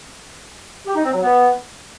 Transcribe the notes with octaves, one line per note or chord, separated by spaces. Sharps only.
G4
D#4
C4
F#3
B3